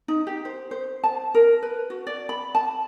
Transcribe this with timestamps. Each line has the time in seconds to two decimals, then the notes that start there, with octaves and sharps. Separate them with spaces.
0.08 D#4
0.27 G4
0.45 C5
0.71 C5
1.04 A5
1.35 A#4
1.63 B4
1.90 F#4
2.07 D5
2.29 B5
2.55 A5